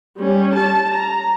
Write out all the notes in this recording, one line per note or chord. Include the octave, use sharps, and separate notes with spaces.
G3 C#4
A5
A#5